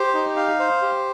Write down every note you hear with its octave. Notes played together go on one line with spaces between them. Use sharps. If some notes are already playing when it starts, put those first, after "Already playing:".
Already playing: G4 C5
D#4
F5
C5
G4